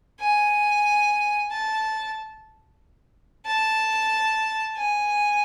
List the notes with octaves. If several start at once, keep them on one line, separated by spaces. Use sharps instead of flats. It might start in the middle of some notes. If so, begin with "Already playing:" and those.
G#5
A5
A5
G#5